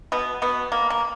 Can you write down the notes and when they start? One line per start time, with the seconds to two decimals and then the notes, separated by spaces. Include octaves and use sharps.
0.12 B2 B3
0.42 B2 B3
0.72 A#3
0.90 A#3